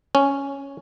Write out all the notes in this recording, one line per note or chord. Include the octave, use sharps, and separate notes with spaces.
C#4